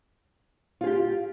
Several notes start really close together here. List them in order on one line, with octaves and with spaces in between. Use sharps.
F4 G#4 G4